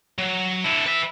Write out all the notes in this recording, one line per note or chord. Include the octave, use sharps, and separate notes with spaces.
F#3
D3 E4
B4 E5